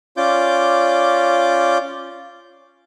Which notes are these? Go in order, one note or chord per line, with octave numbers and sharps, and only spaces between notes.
C#4 F4 D5 D6 G6